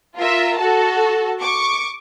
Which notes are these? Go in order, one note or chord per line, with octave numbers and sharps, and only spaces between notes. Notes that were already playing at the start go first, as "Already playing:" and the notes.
F4 A#4 E5
F#4 A4 A5
C#6 D6